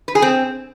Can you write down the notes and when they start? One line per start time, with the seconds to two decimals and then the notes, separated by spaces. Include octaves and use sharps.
0.08 B4
0.15 G#4
0.22 C4